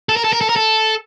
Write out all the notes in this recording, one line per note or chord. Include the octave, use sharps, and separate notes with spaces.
A4
A#4
A4
A#4
A4
A#4
A4